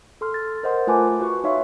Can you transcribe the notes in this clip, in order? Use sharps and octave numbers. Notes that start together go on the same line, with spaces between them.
A4 C6 F6
A6
A#4 C5 D#5 F#5 C6
A3 F4 B4 G#5 A5 D6
F#4 B4 C#6
D#4 C#5 E5 F5 C6